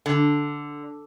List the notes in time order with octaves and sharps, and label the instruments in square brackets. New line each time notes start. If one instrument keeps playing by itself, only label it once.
[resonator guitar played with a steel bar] D3